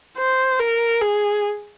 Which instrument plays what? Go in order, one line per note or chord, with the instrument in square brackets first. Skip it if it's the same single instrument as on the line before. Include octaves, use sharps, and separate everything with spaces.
[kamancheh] C5
A#4
G#4